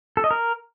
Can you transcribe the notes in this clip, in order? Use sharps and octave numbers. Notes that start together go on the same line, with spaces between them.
A4
D#5
A#4